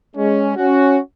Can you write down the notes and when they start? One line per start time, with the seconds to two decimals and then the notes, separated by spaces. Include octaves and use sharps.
0.16 G#3 C#4
0.56 C#4 F#4